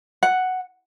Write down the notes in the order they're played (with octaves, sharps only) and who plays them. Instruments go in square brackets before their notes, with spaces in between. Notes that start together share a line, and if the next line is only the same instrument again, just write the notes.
[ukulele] F#5